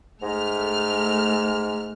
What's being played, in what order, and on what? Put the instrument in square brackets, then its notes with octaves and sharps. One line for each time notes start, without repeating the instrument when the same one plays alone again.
[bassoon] G#2 [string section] A3 F6